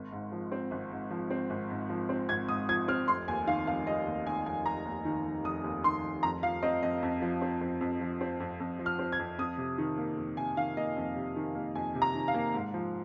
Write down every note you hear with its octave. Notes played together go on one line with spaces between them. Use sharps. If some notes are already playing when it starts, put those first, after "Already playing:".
Already playing: G#1
G#2
F3
C4
G#1
G#2
F3
C4
G#1
G#2
F3
C4
G#1 G#6
G#2 D#6
F3 G#6
C4 F6
F1 C6
D#2 G#5
D#3 F5
F1 F5
F1 D#5
D#2
D#3 G#5
F1 G#5
F1 A#5
D#2
D#3
F1
F1 D#6
D#2
D#3 C6
F1
F2 A#5
F3 F5
C4 D#5
F2 D#5
F2
F3
C4
F2
F2
F3
C4
F2
F2
F3
F6
C4
G#6
F2
F2 D#6
C3
D#3
A#3
F2
C3 G#5
D#3 F5
A#3 D#5
F2
C3
D#3
A#3
F2 G#5
C3
A#5
D#3
F5
A#3
G#2
F3